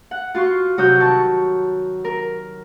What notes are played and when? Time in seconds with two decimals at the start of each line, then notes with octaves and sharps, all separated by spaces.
0.11 F#5
0.35 F4 F#4 C6 C#6
0.77 C3 F#3 F#4 C#5 D#6 G6
1.00 D#3 A5 C#6
2.04 A#4